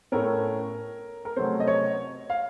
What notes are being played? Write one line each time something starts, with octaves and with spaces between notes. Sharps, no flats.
A2 A3 C#4 A#4
A#4
C3 F#3 A3 C#4 C5
D#5
C#5
F5